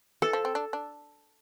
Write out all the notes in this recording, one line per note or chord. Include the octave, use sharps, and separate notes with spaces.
E3 A4
F3
C4
D4
D4